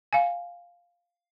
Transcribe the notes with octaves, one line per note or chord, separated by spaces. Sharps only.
F5 G#5